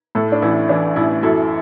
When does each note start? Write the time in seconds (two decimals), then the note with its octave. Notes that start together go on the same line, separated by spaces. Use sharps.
0.15 A2 E4 A4
0.32 D4
0.42 A1 E4
0.69 E3 D4
0.96 A1 E4
1.23 F#2 E4 A4